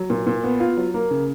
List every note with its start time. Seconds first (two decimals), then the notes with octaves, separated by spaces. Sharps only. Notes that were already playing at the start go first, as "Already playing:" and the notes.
Already playing: F#3
0.10 A#2
0.27 A#2
0.44 B3
0.60 F4
0.77 F#3
0.94 A#3
1.11 C#3